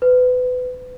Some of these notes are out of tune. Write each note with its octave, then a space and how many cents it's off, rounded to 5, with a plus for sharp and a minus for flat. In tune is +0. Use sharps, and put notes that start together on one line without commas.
B4 +25